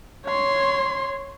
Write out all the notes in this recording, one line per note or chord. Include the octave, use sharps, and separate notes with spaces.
C#5 C6